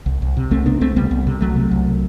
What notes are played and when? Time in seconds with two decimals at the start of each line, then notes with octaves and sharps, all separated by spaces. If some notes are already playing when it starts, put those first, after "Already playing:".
0.06 C2
0.22 C2
0.37 C3
0.51 C2 A3 C4
0.66 C3 B3 D4
0.81 C2 A3 C4
0.96 C2 G3 B3
1.11 C2
1.27 C3
1.41 C2 F#3 A3
1.56 C3
1.71 C2